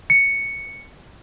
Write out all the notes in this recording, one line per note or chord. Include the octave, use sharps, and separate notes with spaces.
C#7